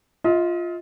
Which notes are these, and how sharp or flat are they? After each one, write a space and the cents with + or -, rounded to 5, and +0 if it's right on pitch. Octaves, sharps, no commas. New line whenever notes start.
F4 +0 D#5 +40